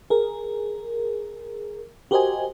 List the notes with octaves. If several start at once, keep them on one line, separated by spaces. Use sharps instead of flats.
G#4 A#4
F#4 G4 A#4 C5 D#5 G#5